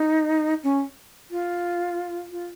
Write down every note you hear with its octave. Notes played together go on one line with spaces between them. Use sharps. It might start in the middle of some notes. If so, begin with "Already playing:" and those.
Already playing: D#4
C#4
F4
F4